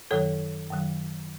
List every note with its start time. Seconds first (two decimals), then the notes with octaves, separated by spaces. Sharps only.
0.11 F#2 D#3 F#3 A4 C#5
0.71 F#2 D#3 F#3